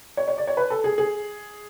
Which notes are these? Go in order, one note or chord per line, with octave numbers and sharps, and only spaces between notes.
C#5
C#5
D5
C#5
B4
A4
G#4
G#4